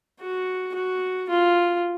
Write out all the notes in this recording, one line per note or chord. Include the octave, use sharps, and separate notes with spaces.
F#4
F#4
F4